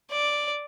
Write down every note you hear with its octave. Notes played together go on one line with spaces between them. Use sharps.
D5